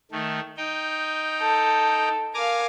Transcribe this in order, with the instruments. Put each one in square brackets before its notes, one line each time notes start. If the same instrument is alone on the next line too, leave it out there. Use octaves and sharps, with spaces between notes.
[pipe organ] D#3 A3
D#4 G5
[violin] A4
[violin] A#4 F5 [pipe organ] G#5 A#5 D6